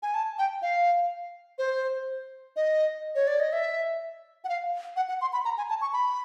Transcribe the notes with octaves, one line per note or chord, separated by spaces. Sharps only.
G#5
A5
G5
F5
C5
D#5
C#5
D5
D#5
E5
F#5
F5
F#5
F#5
C6
B5
A#5
G#5
A5
C#6
B5